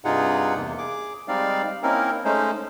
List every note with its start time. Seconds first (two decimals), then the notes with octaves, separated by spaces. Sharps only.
0.05 G2 C3 D#4 F4 G#4 F#5
0.56 E2 C3 A#3
0.78 G#4 D6
1.28 G3 G#3 C4 D#4 D5 F5
1.83 A#3 C4 C#4 D#4 E4 A#4
2.25 G#3 A3 C#4 D#4 C5